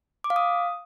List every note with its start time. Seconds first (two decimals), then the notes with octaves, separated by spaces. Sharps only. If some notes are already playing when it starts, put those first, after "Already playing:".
0.24 D6
0.30 F5
0.36 D#6